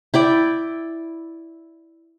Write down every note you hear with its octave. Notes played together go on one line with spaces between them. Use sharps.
E4 D5 G5